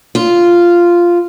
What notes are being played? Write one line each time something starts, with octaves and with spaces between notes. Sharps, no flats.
F4